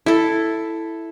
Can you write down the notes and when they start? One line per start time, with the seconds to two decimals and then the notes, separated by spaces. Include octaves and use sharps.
0.06 E4 A4